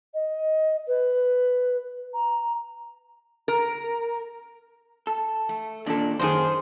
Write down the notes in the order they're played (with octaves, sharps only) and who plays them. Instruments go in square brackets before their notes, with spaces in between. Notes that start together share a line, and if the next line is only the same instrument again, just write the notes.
[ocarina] D#5
B4
A#5
[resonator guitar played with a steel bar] A#4
[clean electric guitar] A4
[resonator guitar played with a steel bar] A3
[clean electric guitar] D#2 A#2 [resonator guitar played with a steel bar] D4 A4
[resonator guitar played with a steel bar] F#2 D#3 G#4 [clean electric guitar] C5